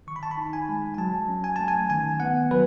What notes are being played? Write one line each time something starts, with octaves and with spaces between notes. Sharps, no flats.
D#3 C#6
B5
A5
B5
D#4
G#5
G#3
G#5
F#3 A5
C#4
G#5
A3 A5
G#5
D#3 G#5
B3 F#5
F#3 B4